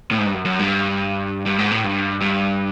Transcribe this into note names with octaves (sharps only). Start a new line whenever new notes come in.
A2
G#2
G2
F#2
F#2
G2
G2
G#2
A2
G2
G2